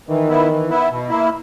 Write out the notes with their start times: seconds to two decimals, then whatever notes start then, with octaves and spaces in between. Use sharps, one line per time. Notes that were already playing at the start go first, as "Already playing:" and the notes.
0.08 D#3 E3
0.29 B3 E4
0.49 E3
0.69 B3 E4
0.90 B2
1.09 A#3 E4